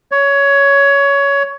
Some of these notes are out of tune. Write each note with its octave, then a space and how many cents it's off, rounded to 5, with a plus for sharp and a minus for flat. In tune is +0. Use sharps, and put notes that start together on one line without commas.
C#5 +15